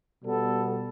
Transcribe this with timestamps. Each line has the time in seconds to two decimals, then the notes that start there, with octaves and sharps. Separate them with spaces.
0.22 B2 G3 B3 A4